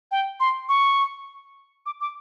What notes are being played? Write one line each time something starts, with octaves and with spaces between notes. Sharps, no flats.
G5
C6
C#6
D6
D6